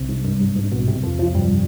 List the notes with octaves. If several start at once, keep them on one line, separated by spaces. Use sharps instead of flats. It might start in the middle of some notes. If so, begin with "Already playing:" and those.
Already playing: C2 C3
G#2
G2
G2
G#2
B1 B2
C2 C3
F2 F3
F2 F3
G2 G3